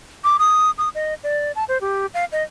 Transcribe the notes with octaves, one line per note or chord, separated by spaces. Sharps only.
D6
D#6
D#6
D#5
D5
A5
C5
G4
F5
D#5